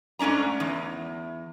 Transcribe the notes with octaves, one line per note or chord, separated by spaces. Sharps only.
G#2 A3 C#4 D4 A#5
E2